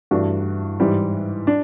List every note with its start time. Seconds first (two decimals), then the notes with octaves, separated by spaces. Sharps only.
0.11 G2 E3 A3 D4 F#4
0.80 G#2 E3 G3
1.47 D4